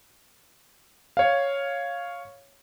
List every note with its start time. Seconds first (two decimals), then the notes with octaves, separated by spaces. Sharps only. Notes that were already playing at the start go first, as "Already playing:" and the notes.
1.17 C#5 F5